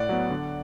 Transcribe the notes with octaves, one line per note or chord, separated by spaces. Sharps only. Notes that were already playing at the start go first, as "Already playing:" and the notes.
Already playing: A2 D5 F#5
F#3 B3
D3